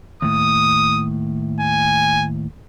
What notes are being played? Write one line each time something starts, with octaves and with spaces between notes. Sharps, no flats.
D#2 A2 D#6
G#5